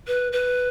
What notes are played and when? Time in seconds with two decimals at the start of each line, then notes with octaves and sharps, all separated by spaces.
0.07 B4
0.32 B4